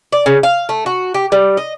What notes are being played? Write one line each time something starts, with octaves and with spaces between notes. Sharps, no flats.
D5
C#3
F5
A3
F#4
G4
G3
D#5